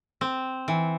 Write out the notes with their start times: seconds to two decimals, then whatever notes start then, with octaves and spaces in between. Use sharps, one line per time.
0.21 C4
0.68 E3